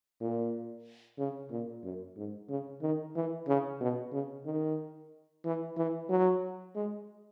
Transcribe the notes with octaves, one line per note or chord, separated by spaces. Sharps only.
A#2
C#3
A#2
F#2
G#2
C#3
D#3
E3
C#3
B2
C#3
D#3
E3
E3
F#3
G#3